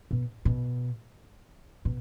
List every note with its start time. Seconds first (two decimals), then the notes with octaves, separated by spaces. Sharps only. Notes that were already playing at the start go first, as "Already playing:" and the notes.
0.11 B2
0.45 B2
1.85 B2